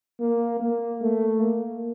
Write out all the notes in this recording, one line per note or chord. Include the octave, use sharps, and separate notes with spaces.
A#3
A#3
A3
A#3